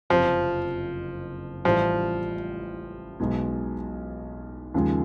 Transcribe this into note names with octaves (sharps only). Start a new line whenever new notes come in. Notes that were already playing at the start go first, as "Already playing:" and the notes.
F#1 F2 C3 F3
A1 A2 E3 F3 G3
B1 B2 G#3
D#2 C#3 F3 G#3